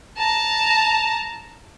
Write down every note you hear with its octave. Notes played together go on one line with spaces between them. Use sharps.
A5 A#5